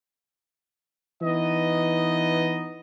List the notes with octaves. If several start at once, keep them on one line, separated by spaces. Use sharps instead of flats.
E3 B3 D#4 D#5